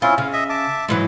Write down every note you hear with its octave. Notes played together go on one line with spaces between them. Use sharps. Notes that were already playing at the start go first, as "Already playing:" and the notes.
C4 C#4 E4 F4
C#3 F5
D#5 E5
E5 A5 D6
G#2 E3 F#3